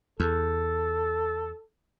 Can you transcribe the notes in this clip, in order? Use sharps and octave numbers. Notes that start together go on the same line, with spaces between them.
E2 A4